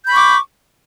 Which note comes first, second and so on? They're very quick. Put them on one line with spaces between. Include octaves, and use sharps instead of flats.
G6 B5 C#6 D6